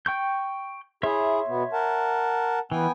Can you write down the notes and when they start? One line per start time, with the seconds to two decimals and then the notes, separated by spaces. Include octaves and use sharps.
0.06 G5 C#6 G6
1.03 E4 G#4 C#5 E5 C6
1.48 B2 B3
1.73 A#4 F#5 A5
2.72 E3 B3 G5 G#5